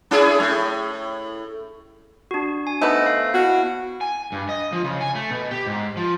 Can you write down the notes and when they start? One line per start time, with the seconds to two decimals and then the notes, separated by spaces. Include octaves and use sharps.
0.11 C#4 E4 G#4
0.40 A2
2.31 D4 F#4
2.67 G#5
2.81 A3 B3 D#4 C5 D#5
3.06 F5
3.34 B3 E4 F#4
4.01 G#5
4.32 G2
4.49 D#5
4.72 F3
4.84 C#3
5.01 G#5
5.15 A3
5.31 B2
5.51 G4
5.67 G#2
5.97 F3